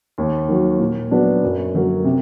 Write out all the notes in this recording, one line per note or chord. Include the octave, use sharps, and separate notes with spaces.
D#2
D#3 F#3
A#2
F#3 B3 D4
F#2
D3 F#3 A#3
C3